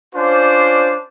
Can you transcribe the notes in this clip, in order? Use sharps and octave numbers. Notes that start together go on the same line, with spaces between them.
C#4 D4 F4 C5 D5